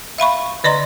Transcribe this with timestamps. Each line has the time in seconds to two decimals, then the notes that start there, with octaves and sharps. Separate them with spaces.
0.18 E5 F5 B5 C#6
0.64 D3 D5 D#5 A#5 C6